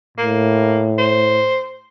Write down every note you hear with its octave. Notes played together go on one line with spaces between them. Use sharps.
A2 A#3
C5